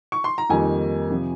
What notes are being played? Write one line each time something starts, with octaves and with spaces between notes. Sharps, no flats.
C#6
C6
A#5
F2 D#3 G3 A#3 G#5
C3 F3